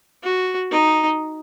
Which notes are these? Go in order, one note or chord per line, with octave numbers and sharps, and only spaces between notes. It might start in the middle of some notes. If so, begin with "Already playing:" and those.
F#4
D#4